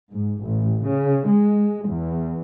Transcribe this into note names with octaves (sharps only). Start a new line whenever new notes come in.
G#2
A1
C#3
G#3
E2